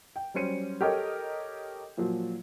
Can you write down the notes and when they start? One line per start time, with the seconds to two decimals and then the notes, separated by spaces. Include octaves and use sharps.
0.16 G5
0.34 F#3 G3 C#4 C5 C#7 D#7
0.81 G4 A4 A#4 C#5 D#5
1.97 A#2 F3 F#3